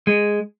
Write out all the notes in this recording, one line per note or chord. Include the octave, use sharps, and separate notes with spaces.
G#3